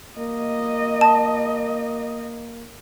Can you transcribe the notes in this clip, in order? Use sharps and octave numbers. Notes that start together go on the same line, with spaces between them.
A#3 D#5
A5